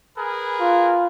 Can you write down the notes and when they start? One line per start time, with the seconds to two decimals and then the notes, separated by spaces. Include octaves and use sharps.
0.18 G#4 A#4 B4
0.60 F4